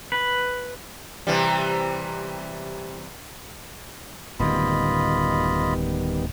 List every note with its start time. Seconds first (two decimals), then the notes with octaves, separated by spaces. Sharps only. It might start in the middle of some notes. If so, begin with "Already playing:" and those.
0.12 B4
1.27 C3 E3 G3
4.40 D1 F#2 D#3 G3 B3 F4 D#5 B5